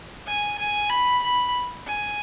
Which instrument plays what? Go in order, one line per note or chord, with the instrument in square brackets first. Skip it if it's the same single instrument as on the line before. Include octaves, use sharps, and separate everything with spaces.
[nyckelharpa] G#5
G#5
B5
B5
G#5